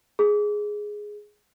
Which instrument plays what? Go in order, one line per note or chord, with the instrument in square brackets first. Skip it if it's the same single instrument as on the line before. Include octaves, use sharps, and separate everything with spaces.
[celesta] G#4